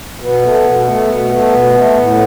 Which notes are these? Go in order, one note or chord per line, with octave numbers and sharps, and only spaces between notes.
B2 B3
A3
B2
A3
B2
A3
B2
A3
A2